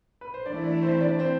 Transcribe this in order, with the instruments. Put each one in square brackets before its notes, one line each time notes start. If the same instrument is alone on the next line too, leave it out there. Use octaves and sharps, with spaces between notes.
[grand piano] B4
C5
[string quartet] E3 A3 E4 [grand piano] D4 D5
[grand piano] D4 D5
C4 C5
D4 D5
C4 C5